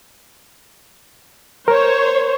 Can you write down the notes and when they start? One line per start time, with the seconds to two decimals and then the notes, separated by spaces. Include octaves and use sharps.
1.68 A#4 C5 C#5